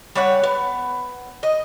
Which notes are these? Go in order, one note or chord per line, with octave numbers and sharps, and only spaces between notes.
G3 C#5 F#5
B3
D#5